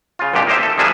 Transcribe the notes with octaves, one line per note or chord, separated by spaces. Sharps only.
C#3 F4
C#2 F#2 A#2 D4 G4
A#3 D#4 G4 C5 E5
A4
F3 G3 A#3 D4 G#4 E5